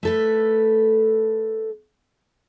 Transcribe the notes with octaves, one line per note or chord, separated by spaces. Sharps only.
A3 A4 B4